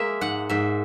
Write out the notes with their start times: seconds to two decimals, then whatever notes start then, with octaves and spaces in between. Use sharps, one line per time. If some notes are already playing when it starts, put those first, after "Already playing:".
Already playing: G#3 A#3 E5
0.21 G#2 F#5
0.49 G#2 E5